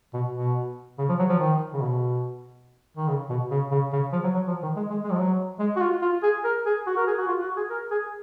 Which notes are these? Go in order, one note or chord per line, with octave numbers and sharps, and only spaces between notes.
B2
B2
C#3
F3
F#3
F3
D#3
C#3
B2
D#3
C#3
B2
C#3
C#3
C#3
F3
F#3
F#3
F3
D#3
G#3
G#3
G#3
F3
F#3
G#3
F#4
F4
F4
G#4
A#4
G#4
F#4
A#4
G#4
F#4
F4
F#4
G#4
A#4
G#4